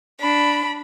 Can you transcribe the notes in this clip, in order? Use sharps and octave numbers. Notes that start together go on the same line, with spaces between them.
D4 B5